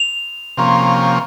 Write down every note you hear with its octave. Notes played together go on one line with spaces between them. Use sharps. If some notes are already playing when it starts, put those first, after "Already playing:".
Already playing: F7
C3 F3 A#3 C#4